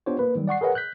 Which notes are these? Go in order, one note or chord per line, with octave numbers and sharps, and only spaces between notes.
B3 D4 F4 G4 C5 C#5
A#3 B4
D#3 F#3 G3
D5 F#5 C#6 C7
G#4 A#4 B4 C#5 D#5 F#5
F#6 G6 B6